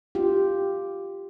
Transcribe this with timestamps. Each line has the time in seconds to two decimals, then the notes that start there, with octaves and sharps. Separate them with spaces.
0.15 F4 G4